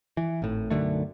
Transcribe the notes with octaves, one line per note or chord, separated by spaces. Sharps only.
E3
G#1 A2
B1 F#2 D3 A3